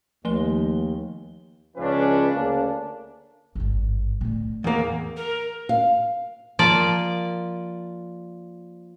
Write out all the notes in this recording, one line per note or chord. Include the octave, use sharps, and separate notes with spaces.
D#2 F3 A3 G7
C#2 C#3 F3 C#4 D4 B4
D2 C#3 A#3 D4
G#1 G2
A2 D3
E2 A#3
A#4
F5
F3 A#3 D5